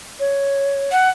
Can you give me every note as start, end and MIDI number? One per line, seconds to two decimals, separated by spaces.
0.20 0.91 73
0.92 1.09 78